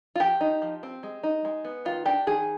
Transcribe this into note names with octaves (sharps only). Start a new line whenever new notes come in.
F4
F3 G4
D#4
F3
C4
G#3
D#4
G#3
B3
D#3 F4
D4 G4
D#3 G#4